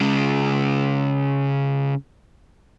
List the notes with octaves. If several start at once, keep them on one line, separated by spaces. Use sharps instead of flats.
C#3 G#3